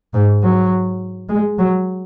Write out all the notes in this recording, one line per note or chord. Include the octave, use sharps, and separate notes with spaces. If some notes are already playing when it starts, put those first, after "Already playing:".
G#2
F#3
G#3
F#3